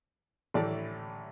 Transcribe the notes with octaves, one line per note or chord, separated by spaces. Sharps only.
A1 A2 E3 A3 D5